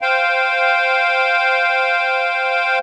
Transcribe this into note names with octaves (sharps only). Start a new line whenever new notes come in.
C5 F5 G5